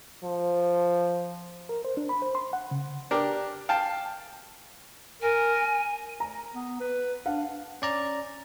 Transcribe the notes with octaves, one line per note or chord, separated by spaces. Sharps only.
F3
A#4
C5
D4
B5
C5
C6
F#5
C#3
D4 G4 A#4
F5 G5 A5
A#4 G#5
A#5
B3
B4
D4 F5 F#5
C#4 D5 A#5